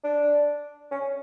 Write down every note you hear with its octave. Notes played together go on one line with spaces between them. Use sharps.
D4
C#4